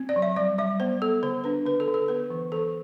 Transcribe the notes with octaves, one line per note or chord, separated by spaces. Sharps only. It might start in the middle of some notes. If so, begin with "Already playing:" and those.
Already playing: C4
D5
F#3
E5
G3 D5
G3 E5
B3 C5
B3 A4
D3 C5
D4 B4
D3 B4
A4
D3
A4
B3 B4
E3
E3 A4